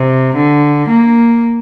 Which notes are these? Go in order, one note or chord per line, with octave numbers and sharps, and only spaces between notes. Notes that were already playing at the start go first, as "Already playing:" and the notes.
Already playing: C3
D3
A#3